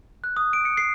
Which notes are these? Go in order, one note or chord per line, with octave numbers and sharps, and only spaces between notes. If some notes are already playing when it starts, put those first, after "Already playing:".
F#6
D#6
D7
C#7
C7